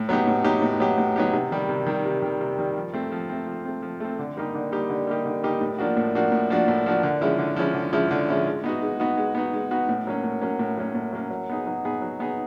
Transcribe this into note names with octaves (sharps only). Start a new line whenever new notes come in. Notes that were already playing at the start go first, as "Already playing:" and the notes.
Already playing: A2
F#3 B3 D#4 G4
A2
F#3 B3 D#4 G4
A2
F#3 B3 D#4 G4
A2
F#3 B3 D#4 G4
C3
D#3 G3
C3
D#3 G3
C3
D#3 G3
C3
D#3 G3
F3
A3 C4
F3
A3 C4
F3
A3 C4
F3
A3 C4
D3
G3 A#3 D#4 G4
D3
G3 A#3 D#4 G4
D3
G3 A#3 D#4 G4
D3
G3 A#3 D#4 G4
A2
F3 A#3 D4 F#4
A2
F3 A#3 D4 F#4
A2
F3 A#3 D4 F#4
A2
F3 A#3 D4 F#4
D3
F3 G#3 C#4 E4
D3
F3 G#3 C#4 E4
D3
F3 G#3 C#4 E4
D3
F3 G#3 C#4 E4
G#3
B3 D#4 F#4
G#3
B3 D#4 F#4
G#3
B3 D#4 F#4
G#3
B3 D#4 F#4
A2
F#3 A#3 C#4
A2
F#3 A#3 C#4
A2
F#3 A#3 C#4
A2
F#3 A#3 C#4
F#3
B3 D#4 G#4
F#3
B3 D#4 G#4
F#3
B3 D#4 G#4